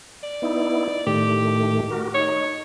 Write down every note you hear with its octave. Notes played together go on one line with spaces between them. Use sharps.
D5
B3 D#4 E4
A2 D#3 A3 G4
F#4 A#4
D#4 C#5